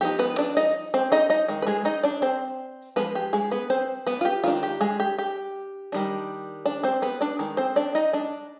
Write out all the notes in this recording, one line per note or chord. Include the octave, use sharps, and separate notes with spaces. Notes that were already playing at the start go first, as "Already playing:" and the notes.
F3 B3 D#4 G4
B3 B4
D4 D5
D#4 D#5
C4 C5
D#4 D#5
D#4 D#5
D#3 G#3
B4
G#3 G#4
D#4 D#5
D4 D5
C4 C5
F3 G#3 B3 B4
G4
G#3 G#4
B3 B4
C4 C5
B3 B4
F4
G4
D#3 G#3 D4 F4
G4
G#3 G#4
G4
G4
D#3 G3 D4
D4 D5
C4 C5
B3 B4
D4 D5
D#3 G#3
C4 C5
D4 D5
D#4 D#5
D4 D5